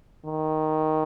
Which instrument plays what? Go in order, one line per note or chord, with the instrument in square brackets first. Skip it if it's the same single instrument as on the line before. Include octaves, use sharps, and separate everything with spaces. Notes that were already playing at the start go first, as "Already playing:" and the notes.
[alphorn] D#3